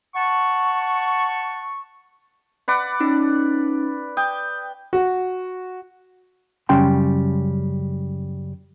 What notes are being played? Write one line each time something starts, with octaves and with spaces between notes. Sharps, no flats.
F#5 A5 C#6
B4 D5 F#5
C#4 D#4
G5 D#6
F#4
F#2 C#3 G3 C#4 G5 C6